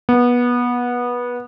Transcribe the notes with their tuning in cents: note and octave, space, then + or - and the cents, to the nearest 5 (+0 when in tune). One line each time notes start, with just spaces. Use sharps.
B3 -20